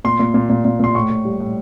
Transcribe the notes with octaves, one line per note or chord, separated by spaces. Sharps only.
A#2 C6
A#2
A#2
A#2
A#2
A#2 C6
A2 C#6
A2
G3
A2